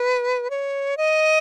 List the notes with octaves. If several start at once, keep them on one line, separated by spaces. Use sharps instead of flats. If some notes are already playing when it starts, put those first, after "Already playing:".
Already playing: B4
C#5
D#5